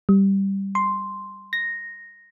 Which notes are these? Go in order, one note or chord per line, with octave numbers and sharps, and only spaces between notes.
G3
C6
A#6